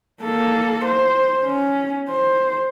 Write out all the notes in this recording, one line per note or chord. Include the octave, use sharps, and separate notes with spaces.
A#3 A4
C5
C#4
C5